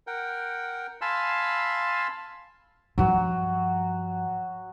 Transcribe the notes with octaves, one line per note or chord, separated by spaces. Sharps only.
A#4 F#5 G5
F5 G#5 A5 B5 C6 E6
G2 F3 F#3 F#4